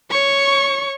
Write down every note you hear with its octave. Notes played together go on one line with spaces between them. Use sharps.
C#5 C#6